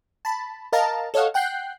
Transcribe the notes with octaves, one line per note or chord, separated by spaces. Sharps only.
A5 B5
A#4 D#5 F5 A5 A#5
A4 C#5 D#5 F5 F#5
F#5 G5 F#6 G6 C7